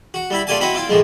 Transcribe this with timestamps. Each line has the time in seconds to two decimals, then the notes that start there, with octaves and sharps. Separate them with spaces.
0.14 F#4
0.30 G3 E4 B5
0.47 A3 F4 G4 D5 G#5 A5
0.60 C4 E4 F#4 D#5 B5
0.75 E4 F4 D6
0.89 A2 E3 F3 G#3